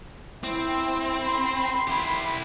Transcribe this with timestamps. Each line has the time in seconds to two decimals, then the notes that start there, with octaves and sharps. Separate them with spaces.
0.44 C4 E4 E6
1.19 B5 C6
1.88 E4 G4